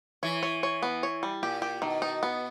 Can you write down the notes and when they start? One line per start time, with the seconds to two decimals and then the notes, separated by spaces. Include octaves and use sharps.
0.23 E3 C#5
0.43 C#5
0.63 C#5
0.83 B3
1.03 C#5
1.23 G3
1.43 A#2 G4
1.62 G4
1.82 B2 D#3
2.02 D#4
2.23 B3